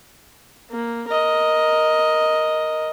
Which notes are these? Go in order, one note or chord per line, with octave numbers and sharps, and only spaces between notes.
A#3
A#4 D#5